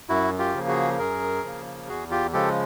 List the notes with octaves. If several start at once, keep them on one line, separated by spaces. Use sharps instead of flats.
F#2 E4 F#4
F4 G4
C#3 F3 A#3
F#4 G#4
F#2 G#4 A#4
C#3 F3 A#3
E2 F#4 G#4
F4 G4
C#3 F3 G#3 G4 A4